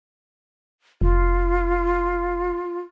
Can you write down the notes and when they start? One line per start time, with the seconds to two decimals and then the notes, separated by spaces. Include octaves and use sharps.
1.01 F1 F4